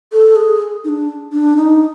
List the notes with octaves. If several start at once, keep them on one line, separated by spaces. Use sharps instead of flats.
A4
G#4
D#4
D4
D4
D#4